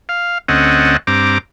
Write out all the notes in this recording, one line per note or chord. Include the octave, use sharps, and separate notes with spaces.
F5
D2 C4 C#4 A4 D#5 F#5
G2 C4 A#5 D6